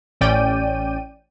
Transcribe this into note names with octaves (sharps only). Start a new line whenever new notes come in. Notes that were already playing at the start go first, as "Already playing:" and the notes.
A1 C#4 D5 G5 D#7